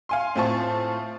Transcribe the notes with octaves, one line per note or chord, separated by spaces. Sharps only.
F5 G#5 C6
A2 C4 F4 C5 A5 C#6